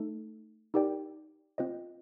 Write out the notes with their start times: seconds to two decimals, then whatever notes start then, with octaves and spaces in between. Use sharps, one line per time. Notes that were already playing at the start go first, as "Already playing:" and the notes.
Already playing: A3 D#4 A4
0.74 D#4 G4 A#4 D5 G5
1.58 C4 F4 C5 D#5